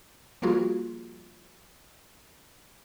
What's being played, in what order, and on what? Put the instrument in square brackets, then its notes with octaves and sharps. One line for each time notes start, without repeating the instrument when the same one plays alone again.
[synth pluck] F3 G3 A#3 F4 F#4 G#4